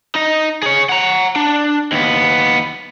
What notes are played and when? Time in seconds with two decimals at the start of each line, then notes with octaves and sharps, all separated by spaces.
0.15 D#4 D#5
0.63 G#4 C#5
0.89 F#5 A#5
1.36 D4
1.92 D#2 B3